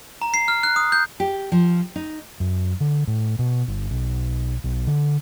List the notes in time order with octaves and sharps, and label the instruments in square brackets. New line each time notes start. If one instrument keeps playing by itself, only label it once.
[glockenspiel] A#5
C7
F6
F#6
D#6
G6
[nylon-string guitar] G4
F3
D#4
[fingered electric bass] F#2
D3
A2
B2
G1
B1
B1
D3